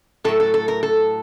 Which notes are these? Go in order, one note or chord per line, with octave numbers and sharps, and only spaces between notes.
A2 F#3 A3 A4
A4
A4
A#4
A4